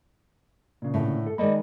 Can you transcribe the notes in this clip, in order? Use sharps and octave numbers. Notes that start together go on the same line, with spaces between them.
A#2 C#3
A2 D3
A4
D#3 G#3 A#3 D5 D#5 B5